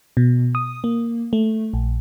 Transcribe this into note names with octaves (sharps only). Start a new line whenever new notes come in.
B2
D#6
A#3
A3
A#1